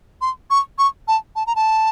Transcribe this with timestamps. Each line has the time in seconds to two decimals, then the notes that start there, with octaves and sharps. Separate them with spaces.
0.21 C6
0.50 C#6
0.78 C#6
1.08 A5
1.36 A5
1.47 A#5
1.56 A5